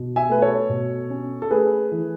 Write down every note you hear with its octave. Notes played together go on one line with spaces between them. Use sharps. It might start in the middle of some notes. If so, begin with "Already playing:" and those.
Already playing: B2
E5 G#5
A3 B4
A4 C#5
B2
C#4
A4
A3 G#4 B4
E3